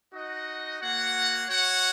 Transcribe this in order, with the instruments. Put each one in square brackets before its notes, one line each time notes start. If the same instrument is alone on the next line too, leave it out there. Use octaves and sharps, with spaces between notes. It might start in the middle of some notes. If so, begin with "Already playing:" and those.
[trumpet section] D#4 F#4 D#5 F#5
A#3 F#4 C#5 F#5
F#4 C#5 F#5